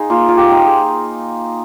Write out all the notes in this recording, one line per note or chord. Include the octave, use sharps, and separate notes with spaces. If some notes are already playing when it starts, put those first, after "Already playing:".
Already playing: D#4 G#4 C5 F5
A#3 F4
F4
G4
D#4
G#4